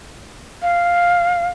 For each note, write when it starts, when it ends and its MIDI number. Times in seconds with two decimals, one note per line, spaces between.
0.62 1.47 77